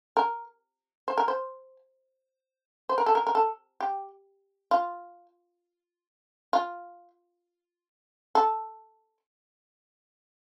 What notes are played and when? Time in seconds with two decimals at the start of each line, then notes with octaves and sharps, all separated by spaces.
0.17 A#4
1.08 C5
1.18 A#4
1.28 C5
2.89 C5
2.98 A#4
3.06 A4
3.15 A#4
3.27 A#4
3.35 A4
3.80 G4
4.71 F4
6.53 F4
8.35 A4